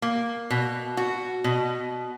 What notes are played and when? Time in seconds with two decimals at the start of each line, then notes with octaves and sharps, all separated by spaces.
0.02 A#3
0.50 B2
0.97 F#4
1.44 B2